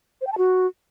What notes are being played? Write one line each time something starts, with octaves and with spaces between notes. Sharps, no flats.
C5
G5
A5
F#4